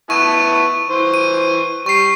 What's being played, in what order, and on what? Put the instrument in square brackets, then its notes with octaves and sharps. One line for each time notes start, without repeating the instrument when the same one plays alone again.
[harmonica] B3 E4 A5 [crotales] C#6 D#7
[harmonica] E3 C5
[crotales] D#7
[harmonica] G3 [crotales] C#6 C7